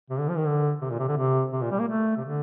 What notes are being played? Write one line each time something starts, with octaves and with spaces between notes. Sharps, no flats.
C3
D3
F3
D#3
D3
C3
A#2
C3
D3
C3
C3
A#2
G3
A#3
A3
C3
D3